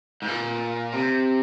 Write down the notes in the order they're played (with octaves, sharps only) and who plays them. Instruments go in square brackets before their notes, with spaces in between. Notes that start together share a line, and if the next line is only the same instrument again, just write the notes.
[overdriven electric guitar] G#2
A#2
C3